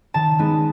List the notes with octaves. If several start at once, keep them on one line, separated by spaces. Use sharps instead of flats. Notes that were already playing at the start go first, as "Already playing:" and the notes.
D#3 A5
G#3 B3 D#4